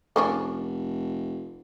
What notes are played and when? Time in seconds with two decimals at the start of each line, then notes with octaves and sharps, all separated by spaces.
0.16 F1 A#3 C#4 D4